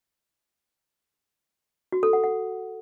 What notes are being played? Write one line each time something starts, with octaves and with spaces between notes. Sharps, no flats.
F#4
A4
F#5
F#5